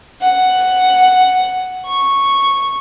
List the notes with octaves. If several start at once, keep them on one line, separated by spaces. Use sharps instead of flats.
F#5
C#6